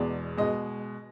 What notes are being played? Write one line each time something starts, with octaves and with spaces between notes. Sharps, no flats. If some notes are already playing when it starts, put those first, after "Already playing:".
Already playing: E2 B2 G#3 D5
B2 G#3 D#5